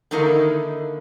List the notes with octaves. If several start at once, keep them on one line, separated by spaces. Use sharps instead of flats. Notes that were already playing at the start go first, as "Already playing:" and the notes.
D3 D#3 A#3 D#4 E4 A#4